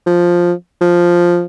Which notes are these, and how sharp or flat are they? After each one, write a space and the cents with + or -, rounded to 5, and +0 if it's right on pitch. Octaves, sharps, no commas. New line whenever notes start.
F3 +5
F3 +0